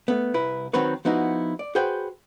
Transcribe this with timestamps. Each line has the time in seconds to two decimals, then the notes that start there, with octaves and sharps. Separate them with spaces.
0.08 A3 B3
0.34 C2 E4 B4
0.73 D#3 F#3 C4 B4 C#5
1.05 F3 B3 D#4 E4 F#4
1.59 D5
1.75 F#4 G#4 B4 C5 G5